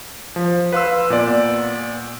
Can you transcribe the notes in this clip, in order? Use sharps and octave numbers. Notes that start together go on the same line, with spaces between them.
F3
B4 F5 C6 E6
A#2 B3 D5